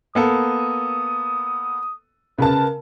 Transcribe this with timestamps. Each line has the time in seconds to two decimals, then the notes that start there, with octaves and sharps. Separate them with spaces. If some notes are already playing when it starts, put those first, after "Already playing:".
0.15 A#3 B3 A4 D#6
2.38 C#3 A#4 B4 A5